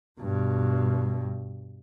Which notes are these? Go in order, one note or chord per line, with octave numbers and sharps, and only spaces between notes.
G2 B2